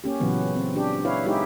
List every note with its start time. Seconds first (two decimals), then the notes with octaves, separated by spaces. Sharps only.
0.04 A#3 C#4 G4
0.20 A#2 C#3 E3 F#3 B3
0.56 C4
0.76 D4 G4
1.04 E4 B4 C#5 F5
1.26 G#3 D#4 E4 G4 G#4